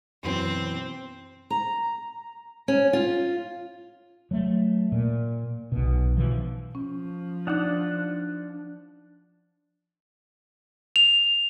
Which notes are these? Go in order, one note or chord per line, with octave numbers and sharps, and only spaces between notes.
F#2 B2 E3 C4
A#5
C#4
F4
F#3 A3
A#2
B1 B2
B2 E3 F3
F3 C#4
D4 D#4 F#5 D6
F7